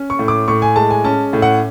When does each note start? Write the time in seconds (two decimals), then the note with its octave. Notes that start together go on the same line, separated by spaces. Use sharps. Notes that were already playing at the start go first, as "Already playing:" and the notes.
Already playing: C#4
0.10 C#6
0.19 A2
0.28 D6
0.48 A2 C#6
0.62 G#5
0.76 G#3 A5
0.90 G#5
1.04 C#4 A5
1.33 A2
1.42 F#5